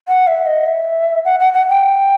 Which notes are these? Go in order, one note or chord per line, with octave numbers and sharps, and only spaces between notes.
F#5
E5
D#5
E5
F#5
F#5
F#5
G5